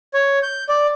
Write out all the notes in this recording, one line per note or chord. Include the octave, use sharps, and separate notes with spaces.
C#5
G6
D5